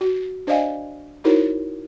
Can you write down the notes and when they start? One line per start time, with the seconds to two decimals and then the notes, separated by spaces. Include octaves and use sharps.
0.01 F#4
0.47 D4 C5 D5 D#5 F5 G#5
1.24 D#4 E4 F#4 A#4 C5 C#5